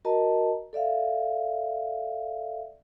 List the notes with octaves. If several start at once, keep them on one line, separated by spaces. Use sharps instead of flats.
F#4 A#4 D#5 A5 A#5
A4 D5 E5 F5